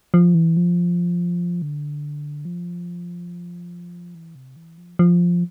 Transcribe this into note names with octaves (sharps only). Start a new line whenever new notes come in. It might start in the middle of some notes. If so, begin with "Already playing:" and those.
F3
E3
F3
D3
F3
E3
C3
E3
F3
F3